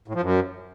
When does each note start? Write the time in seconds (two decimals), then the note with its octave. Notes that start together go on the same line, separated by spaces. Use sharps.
0.08 A2
0.15 F3
0.21 F#2